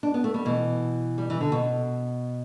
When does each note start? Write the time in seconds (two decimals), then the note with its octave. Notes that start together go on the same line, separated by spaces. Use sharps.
0.03 D4
0.14 B3
0.24 A3
0.34 G3
0.45 B2 E3
1.18 G3
1.30 E3
1.41 D3
1.52 B2